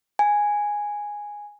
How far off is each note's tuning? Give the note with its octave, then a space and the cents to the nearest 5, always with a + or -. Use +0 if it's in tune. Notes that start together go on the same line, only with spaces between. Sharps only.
G#5 -5